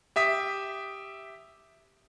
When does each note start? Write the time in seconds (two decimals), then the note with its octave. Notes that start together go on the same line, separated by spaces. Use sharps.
0.16 G4 E5 D#6 B6